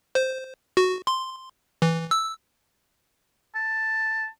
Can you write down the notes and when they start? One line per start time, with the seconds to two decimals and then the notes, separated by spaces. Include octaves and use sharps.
0.15 C5
0.77 F#4
1.07 C6
1.82 E3
2.11 E6
3.55 A5